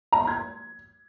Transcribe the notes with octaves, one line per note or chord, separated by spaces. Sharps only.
A#5
C6
G#6